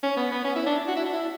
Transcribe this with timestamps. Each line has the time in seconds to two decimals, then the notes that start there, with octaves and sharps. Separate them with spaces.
0.03 C#4
0.17 B3
0.32 B3
0.45 C#4
0.56 E4
0.66 D4
0.88 F#4
0.96 E4
1.06 D4
1.13 E4